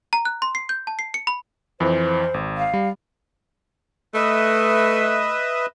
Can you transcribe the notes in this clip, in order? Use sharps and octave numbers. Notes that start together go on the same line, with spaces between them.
A#5
F#6
C6
C7
G6
A5
C7
C#7
B5
F2 E3 C5
G#1
F5
G3
A3 B4 D#5 E5